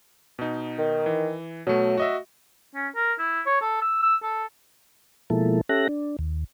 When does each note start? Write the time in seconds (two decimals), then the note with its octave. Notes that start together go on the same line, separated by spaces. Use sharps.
0.39 B2 D#4
0.78 D#3
1.06 E3
1.67 B2 F#3 A3
1.98 F#4 D#5 E5
2.75 C#4
2.95 A#4
3.19 E4
3.46 C#5
3.62 A4
3.82 E6
4.03 E6
4.23 A4
5.30 B2 F3 G#3 A#3 E4 A4
5.69 C#4 G4 A4 E5 F#6 A#6
5.89 D4
6.19 D#2